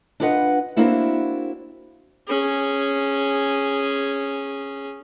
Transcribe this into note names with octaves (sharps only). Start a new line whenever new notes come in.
D4 E4 F4 B4 D#5 F#5
A#3 C4 D4 E4 F#4
C#4 G#4